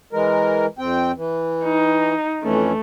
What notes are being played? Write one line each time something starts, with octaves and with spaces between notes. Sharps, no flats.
E3 G#3 A#4
F2 C4 G5
E3
D#4
F2 E3 A3 C#4